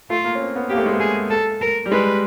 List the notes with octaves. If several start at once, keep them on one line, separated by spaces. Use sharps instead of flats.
A3 F4
A#3
C#4
C4
B3
A#3 G4
A3
G#3
A3
G#4
A4
A#4
G3
G#3 B4